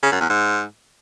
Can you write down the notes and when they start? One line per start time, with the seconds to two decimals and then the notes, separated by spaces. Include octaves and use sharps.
0.03 C#3
0.12 F#2
0.21 E2
0.29 G#2